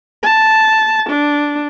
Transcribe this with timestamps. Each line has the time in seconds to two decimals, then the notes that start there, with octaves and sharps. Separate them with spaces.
0.23 A5
1.10 D4